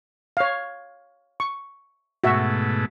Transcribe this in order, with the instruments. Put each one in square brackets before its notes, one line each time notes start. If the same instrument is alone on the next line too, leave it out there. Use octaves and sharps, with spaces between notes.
[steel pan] C#5 F5
C#6
[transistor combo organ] G#2 B2 A3 [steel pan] F#4 E5